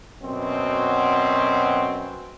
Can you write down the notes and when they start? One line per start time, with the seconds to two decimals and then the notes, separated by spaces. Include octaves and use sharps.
0.21 F#2 B2 C4 F#4